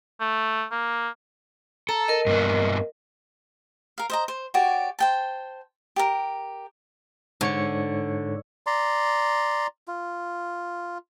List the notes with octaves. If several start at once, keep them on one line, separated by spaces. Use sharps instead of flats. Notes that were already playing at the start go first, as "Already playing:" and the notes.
A3
A#3
A4 A#5
A#4 D#5
G2 A#3 B3
A#4 F5
C5 D#5 A#5
C5
F#4 G4 C#5 D5
C5 G5 A5
G4 A4 A#4
G#2 D3 C#5 C#7
D5 A#5 C6
F4